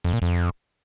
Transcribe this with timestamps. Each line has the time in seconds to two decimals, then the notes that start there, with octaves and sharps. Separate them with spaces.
0.04 F2
0.13 A#2
0.22 F2